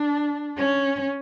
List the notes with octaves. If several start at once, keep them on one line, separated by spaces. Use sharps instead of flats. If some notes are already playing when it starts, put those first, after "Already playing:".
Already playing: D4
C#4